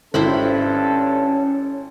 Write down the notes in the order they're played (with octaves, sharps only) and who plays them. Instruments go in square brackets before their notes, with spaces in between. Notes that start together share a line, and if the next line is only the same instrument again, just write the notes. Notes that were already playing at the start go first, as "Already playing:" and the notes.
[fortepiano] G#1 [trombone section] G2 A4 [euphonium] C#4 [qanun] E4 C5 B5